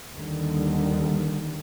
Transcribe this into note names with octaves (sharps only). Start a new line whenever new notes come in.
D#2 D3 D#3 G3